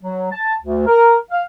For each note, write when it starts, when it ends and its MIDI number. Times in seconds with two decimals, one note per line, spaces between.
0.03 0.31 54
0.31 0.54 81
0.62 0.86 38
0.86 1.16 70
1.31 1.42 77